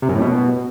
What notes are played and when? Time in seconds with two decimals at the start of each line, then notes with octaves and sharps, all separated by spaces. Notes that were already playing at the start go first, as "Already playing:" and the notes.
0.02 C3
0.09 F#2
0.15 A2
0.22 B2